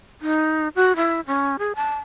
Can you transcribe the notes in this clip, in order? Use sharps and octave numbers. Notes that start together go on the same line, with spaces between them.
D#4
F#4
E4
C#4
G#4
A5